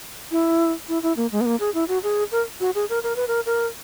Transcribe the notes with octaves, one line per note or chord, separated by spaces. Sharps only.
E4
E4
E4
A#3
G#3
B3
A#3
G#4
E4
F#4
G#4
A#4
F#4
G#4
A#4
A#4
B4
A#4
A#4